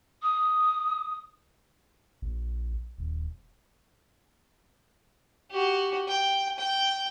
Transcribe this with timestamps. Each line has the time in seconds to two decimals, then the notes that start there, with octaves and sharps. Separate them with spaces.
0.22 D#6
2.22 A#1
2.98 D#1
5.51 F#4 G4
6.08 G5
6.58 G5